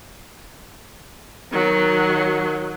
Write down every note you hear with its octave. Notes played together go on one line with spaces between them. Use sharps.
D#3 F#3